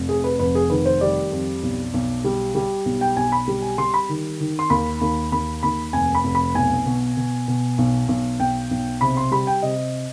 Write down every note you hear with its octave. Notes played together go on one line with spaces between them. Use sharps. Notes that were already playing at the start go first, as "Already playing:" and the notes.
Already playing: F1
F2 G#4
B4
F1 B4
G#4
D#3 B4
C5
G3 D5
F2
B1
B1
G3
G3
B1
G5
B1 G#5
B5
G3
G#5
G3 C6
B5
D#3
D#3
C6
D#2 B5
D#2
D#2 B5
D#2 B5
F1 G#5
B5
F1
B5
B1 G#5
B2
B2
B2
B1
B1
B1 G5
B1
C3 B5
C6
G3 B5
G5
C3 D#5